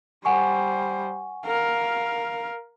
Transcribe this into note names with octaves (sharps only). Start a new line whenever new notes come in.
G3 C5 F#5 G#5 C#6
A#4 F5